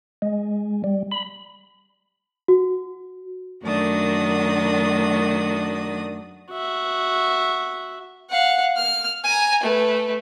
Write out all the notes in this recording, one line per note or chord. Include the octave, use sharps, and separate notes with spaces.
G#3
G3
B5
F#4
F#2 D#3 A3 D4 F#4 D#6
F#4 E5
F5 F#5
F6
G#5 A#5
A3 B4